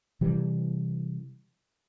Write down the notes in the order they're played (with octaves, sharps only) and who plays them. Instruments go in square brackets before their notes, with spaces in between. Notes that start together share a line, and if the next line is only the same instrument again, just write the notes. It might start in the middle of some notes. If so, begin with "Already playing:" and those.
[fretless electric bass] C3 E3 G3